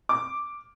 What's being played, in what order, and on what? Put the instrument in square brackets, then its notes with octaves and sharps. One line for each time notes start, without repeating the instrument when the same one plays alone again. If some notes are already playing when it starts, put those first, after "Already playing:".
[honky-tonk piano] D6